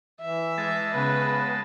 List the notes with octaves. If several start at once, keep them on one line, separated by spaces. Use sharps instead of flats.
E3 E5
G#3 A5
C#3 B3 B4